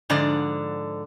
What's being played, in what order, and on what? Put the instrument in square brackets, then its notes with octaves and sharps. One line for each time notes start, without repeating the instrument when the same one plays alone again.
[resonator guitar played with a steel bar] G#2 D3 F3 D5